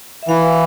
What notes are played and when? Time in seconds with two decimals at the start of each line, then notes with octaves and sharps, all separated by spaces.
0.23 E5
0.28 E3 F5